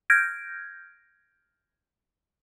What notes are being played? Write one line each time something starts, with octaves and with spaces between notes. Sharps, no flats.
F6 G6 G#6 A#6 D7